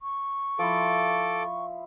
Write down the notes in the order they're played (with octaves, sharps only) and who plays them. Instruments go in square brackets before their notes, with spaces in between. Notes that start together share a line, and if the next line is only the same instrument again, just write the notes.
[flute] C#6
[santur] F3 E4 [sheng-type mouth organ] A4 D6